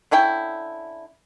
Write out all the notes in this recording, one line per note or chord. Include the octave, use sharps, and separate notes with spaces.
D3 C#4 E4 G5